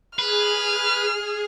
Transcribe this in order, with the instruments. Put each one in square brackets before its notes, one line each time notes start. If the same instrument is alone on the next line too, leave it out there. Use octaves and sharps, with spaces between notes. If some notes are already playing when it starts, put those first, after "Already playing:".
[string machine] G#4 [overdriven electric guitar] B4 [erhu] F6